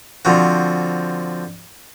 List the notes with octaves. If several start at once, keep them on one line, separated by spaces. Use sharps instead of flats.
D3 F3 C4 F#4